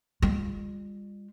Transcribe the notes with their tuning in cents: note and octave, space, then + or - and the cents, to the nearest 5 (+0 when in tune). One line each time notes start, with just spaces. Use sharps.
G3 +45 F4 +0